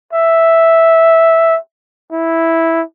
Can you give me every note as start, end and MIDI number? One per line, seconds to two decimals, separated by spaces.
0.13 1.58 76
2.12 2.83 64